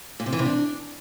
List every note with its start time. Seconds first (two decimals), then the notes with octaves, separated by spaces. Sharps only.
0.20 A#2
0.26 C3
0.33 E3
0.39 C3
0.45 D4